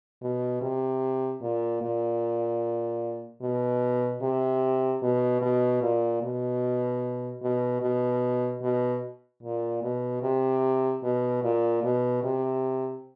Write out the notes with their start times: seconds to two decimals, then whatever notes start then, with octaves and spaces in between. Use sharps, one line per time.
0.22 B2
0.62 C3
1.42 A#2
1.82 A#2
3.42 B2
4.22 C3
5.02 B2
5.42 B2
5.82 A#2
6.22 B2
7.43 B2
7.82 B2
8.62 B2
9.43 A#2
9.83 B2
10.23 C3
11.03 B2
11.43 A#2
11.83 B2
12.23 C3